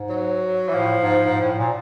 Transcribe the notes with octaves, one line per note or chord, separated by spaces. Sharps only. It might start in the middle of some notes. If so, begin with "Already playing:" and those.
Already playing: G#2
F#3
E3
A2 F3
G#2
G#2
A2
A#2